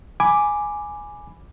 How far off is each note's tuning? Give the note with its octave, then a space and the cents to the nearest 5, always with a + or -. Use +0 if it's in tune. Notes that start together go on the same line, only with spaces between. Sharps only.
G#5 +0 B5 +0 D6 +0